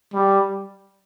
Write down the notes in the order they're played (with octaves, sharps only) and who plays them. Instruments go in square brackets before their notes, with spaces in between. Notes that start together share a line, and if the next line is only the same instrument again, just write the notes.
[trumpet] G3